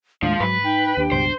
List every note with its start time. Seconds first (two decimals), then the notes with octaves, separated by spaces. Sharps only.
0.23 D#2 A2 F3 G#3 D4
0.40 G#2 F#3 B4
0.63 D#4 G5
0.97 D#2 D4 G4
1.12 C#2 G2 B2 C5